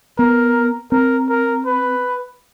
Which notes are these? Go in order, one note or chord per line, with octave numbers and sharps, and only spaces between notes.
B3 A#4
C4 A#4
A#4
B4